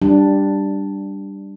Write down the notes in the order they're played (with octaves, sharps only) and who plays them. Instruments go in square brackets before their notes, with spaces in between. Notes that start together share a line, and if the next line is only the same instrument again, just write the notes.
[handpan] G3 D4